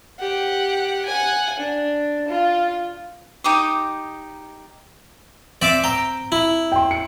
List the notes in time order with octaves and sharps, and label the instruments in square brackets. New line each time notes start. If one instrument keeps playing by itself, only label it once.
[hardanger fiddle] G4 F#5
F#5 G#5
D4
F4
[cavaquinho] D#4 G4 D6 D#6
[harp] C4 [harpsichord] D5 E5 D6
[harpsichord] G5 [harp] A#5 E6 A#6
[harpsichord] E4
[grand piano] G5 C6
C#7